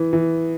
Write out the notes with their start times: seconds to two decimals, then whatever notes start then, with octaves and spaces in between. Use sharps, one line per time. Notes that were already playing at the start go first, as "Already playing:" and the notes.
Already playing: E3 B3
0.13 E3